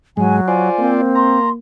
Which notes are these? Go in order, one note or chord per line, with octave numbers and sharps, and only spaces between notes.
G#2 F#3 G#3 G#5
F4 C5 D5 G#5
A#3 C4
A#5 C6